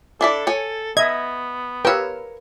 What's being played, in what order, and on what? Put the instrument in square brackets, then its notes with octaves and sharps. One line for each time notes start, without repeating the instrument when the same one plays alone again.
[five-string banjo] D4 E4 D5 [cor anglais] A4
[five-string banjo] C#5 G#5
[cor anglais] B3 [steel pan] D#5 E5 [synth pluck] G#6
[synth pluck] G4 E6 [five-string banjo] A#4 C#5 [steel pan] B4 F5